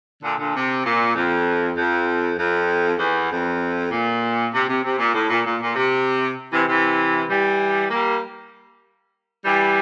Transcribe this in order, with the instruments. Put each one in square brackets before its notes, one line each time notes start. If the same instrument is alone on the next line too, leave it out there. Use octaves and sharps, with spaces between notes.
[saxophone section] A#2 D3
A#2 D3
C3
A#2
F2
F2
F2
E2
F2
A#2
C3
C3
C3
A#2
A2
A#2
A#2
A#2
C3
C3 E3
C3 E3
E3 G3
G3 A#3
E3 G3